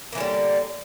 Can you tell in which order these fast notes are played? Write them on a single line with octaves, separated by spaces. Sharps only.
A#3 E3 D3 G3